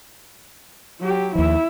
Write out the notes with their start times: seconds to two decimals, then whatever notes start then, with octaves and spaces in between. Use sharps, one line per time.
1.00 F#3 G4
1.35 D#2 F3 E4 E5